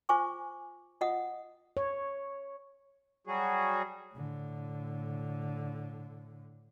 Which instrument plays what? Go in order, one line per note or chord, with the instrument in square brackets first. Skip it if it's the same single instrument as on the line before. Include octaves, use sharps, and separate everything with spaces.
[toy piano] F4 C5 G#5 C#6 D6
F4 D#5 F#5 D#6
[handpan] C#5
[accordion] F#3 G3 F#4 G#4
[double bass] A2 D3